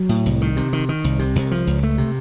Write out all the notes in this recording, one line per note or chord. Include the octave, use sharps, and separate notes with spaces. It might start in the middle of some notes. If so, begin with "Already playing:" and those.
Already playing: F#3
A2
C2
D#3
C3
D#3
D#3
C2
C3
C2
F3
C#2
A3
C3